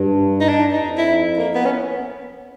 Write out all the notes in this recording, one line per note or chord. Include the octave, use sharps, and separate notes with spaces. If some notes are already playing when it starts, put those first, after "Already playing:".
Already playing: G2
D#4
D4
F2 D#4
E4
A#3
B3
C#4